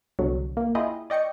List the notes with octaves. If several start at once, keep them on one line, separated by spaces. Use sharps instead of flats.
C2 B2 D3 F#3
A#3
E4 F4 G#4 D#5 G5
D5 D#5 G5 C#6 C#7